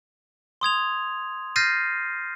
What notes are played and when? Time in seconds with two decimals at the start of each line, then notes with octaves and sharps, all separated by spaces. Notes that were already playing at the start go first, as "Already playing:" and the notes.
0.61 C6 D#6 G#6 F7
1.56 F6 G6 A6 A#6 C7 D#7